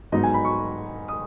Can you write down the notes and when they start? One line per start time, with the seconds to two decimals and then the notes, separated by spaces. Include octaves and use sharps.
0.12 G#2 F#3 B3 D#4 D#5
0.23 G#5
0.34 B5
0.45 C#6
1.08 D#6